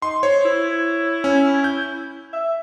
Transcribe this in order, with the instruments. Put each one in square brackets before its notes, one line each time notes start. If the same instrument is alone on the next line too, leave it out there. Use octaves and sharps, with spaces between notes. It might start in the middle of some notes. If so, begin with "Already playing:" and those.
[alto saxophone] D#4 [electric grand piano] C6
[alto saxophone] C5 [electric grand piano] C#5
[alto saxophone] E4
[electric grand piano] C#4
G6
[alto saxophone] E5